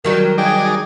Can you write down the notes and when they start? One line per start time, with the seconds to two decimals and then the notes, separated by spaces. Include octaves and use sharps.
0.05 D#3 F#3 G3 A#4
0.38 D#4 G#4 D5 G5